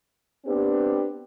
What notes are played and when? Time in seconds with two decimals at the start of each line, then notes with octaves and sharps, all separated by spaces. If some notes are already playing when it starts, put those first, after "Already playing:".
0.46 B3 C4 D4 G4